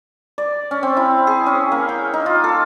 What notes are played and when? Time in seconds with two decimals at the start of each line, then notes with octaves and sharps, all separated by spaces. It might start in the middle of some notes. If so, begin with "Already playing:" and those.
0.38 D5
0.71 C#4
0.83 C4
0.97 E4
1.27 G#4
1.46 C#4
1.72 A#3
1.89 G5
2.14 D#4
2.26 F4
2.44 A4